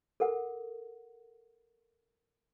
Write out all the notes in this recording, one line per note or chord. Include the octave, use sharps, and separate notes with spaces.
A4 A#4 F#5